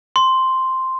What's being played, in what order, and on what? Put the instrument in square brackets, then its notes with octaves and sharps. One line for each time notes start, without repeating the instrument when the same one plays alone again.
[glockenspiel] C6